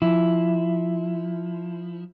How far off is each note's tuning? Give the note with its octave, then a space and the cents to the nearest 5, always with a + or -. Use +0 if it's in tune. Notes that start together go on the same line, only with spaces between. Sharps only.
F3 +0 E4 +0